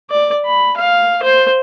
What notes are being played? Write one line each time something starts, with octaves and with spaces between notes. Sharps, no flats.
D5
B5
F5
C5